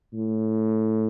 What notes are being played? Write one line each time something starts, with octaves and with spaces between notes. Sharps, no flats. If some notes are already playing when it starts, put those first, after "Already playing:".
A2